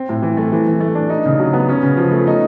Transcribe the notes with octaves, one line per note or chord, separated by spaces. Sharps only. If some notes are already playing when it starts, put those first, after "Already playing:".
Already playing: C4
A2
E3
A3
E3
E3
A3
D4
D#4
C#3
F#3
B3
C#4
C#3
F3
A3
D#4